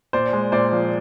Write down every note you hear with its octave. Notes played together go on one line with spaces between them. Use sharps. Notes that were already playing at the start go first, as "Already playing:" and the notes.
A#2 C5 D5
G#3
A#2 C5 D5
F3